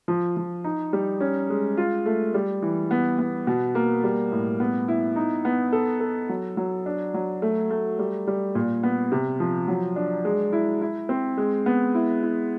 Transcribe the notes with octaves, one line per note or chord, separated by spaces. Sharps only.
F3
F3
D#4
G3
C#4
G#3
F4
A3
G3
E3
B3
B3
B2
A#3
G3
A2
B3
E4
D#4
B3
A4
A4
F#3
F#3
D4
F#3
A3
A3
G3
G3
A#2
B3
C3
F3
F#3
D4
G#3
E4
E4
C4
G#3
B3
E4
E4